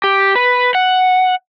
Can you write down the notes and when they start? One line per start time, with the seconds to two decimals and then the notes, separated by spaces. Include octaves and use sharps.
0.04 G4
0.36 B4
0.75 F#5